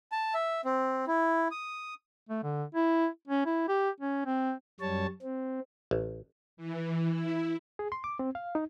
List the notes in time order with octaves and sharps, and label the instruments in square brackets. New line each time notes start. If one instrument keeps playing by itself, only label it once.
[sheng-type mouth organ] A5
E5
C4
E4
D#6
[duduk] A3
D3
E4
C#4
E4
G4
C#4
C4
[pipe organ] F#2 G3 C#5 A5
C4
[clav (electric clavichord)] A1
[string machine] E3
E4
[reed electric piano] G#4
C6
D6
C4
F5
D#4